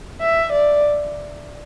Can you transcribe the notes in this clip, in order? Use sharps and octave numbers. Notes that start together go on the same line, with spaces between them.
E5
D5